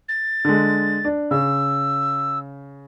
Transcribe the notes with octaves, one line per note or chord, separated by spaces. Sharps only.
A6
D3 G#3
D4
C#3 E6